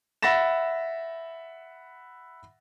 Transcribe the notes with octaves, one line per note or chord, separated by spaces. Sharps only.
E5 F#5 B5 A6 A#6 E7